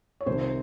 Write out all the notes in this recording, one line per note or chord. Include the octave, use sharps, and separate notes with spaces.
C#5
C2 C3 D#3 C5
C5